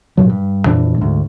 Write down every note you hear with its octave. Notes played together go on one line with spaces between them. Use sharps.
G2 A#2 F#3
G2
F2 A#2 E3 D4
D2 G#2